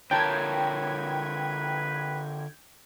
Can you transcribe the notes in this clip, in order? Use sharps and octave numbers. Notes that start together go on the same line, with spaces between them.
D3 F4 A#4 B4 C#5 G5 A5 G#6